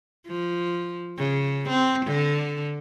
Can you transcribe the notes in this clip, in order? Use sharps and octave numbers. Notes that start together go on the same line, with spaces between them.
F3
C#3
C4
D3